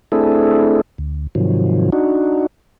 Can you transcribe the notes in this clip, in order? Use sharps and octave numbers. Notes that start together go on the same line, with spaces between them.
A3 C4 D4 E4 G#4 A4
D2
G#2 C3 D#3 F3 F#3
D4 D#4 F#4